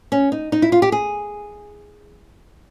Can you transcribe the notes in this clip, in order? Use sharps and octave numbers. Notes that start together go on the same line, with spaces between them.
C#4
D#4
D#4
E4
F4
G4
G#4